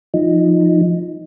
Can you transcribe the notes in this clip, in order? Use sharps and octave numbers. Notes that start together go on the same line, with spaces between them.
F3 D#4